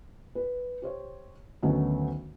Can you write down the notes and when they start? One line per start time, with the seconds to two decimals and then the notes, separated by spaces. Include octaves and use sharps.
0.35 B4
0.82 G4 C5 C#5
1.63 D2 D#3 F#3 A3 B3 C#4